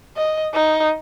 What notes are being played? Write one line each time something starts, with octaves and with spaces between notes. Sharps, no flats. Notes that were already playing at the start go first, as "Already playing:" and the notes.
D#5
D#4